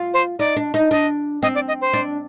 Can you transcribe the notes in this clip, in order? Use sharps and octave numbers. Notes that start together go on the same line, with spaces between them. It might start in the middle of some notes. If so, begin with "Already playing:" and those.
Already playing: F4
C5
D#4 D5
D4
D#4
D4 D#5
C4 D#5
D5
D#5
C5
D4